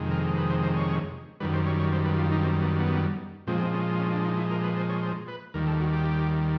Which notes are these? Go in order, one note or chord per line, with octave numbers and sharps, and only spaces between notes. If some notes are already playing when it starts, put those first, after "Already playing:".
Already playing: F2 C3 D#3 G#3
A#4
B4
C5
C5
C#5
F#2 D#3 G3 B4
C5
C#5
C#5
C5
B4
F4
D#4
C4
B3
B3
A#2 F3 G#3 C4
C4
C#4
C#4
D4
D#4
E4
A#4
B4
C5
C#5
C5
B4
D#2 D#3 G3 A#4
A4
F#4
G4